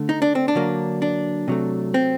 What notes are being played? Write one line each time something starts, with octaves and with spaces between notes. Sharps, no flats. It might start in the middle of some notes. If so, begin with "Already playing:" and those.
Already playing: D3 A3
D#4
D4
C4
D4
D3 F#3 A#3
D4
C3 F#3 A3
C4